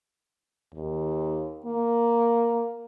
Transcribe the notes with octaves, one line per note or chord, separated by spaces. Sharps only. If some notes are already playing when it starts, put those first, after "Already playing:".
D#2
A#3